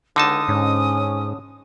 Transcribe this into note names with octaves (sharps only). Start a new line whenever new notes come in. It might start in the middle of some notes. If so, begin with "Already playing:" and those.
C#2 D3 D#4 A5 D#6
G#2 C#4